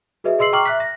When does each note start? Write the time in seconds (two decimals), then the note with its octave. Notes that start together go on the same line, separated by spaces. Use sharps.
0.24 F#4 G#4 B4 D#5 E5
0.39 G#4 D#5 C6 E6 C7 F#7
0.53 G5 A#5 C#6 D6 F6 F#7
0.66 E5 F#6 B6
0.80 A#6